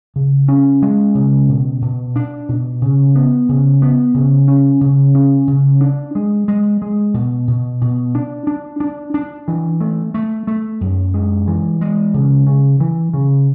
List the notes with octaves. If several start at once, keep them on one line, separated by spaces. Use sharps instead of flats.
C#3
C#4
G#3
C#3
B2
B2
D4
B2
C#3
B3
C#3
B3
C#3
C#4
C#3
C#4
C#3
D4
G#3
G#3
G#3
B2
B2
B2
D4
D4
D4
D4
E3
A3
A3
A3
F#2
G#3
E3
G#3
C#3
C#3
E3
C#3